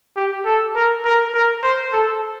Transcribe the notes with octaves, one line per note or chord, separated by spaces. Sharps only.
G4
A4
A#4
A#4
A#4
C5
A4